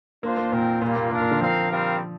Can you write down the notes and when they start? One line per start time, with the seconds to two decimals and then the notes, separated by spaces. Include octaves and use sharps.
0.23 A#3 D4 F4 C5
0.37 A#3
0.52 A#2 C4 F4 A#4 G5
0.82 A#2 G3 A#3 F4
0.96 A#2
1.11 A#2 D4 A#4 F5
1.21 A#2
1.31 D3
1.40 F3 C4 A#4 F5
1.70 G3 C4 A#4 F5